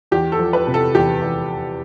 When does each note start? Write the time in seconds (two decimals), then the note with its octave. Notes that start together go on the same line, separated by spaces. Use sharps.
0.11 E2 G4
0.32 A4
0.38 F3
0.53 B4
0.67 C3
0.74 A4
0.95 E2 G4
1.22 E2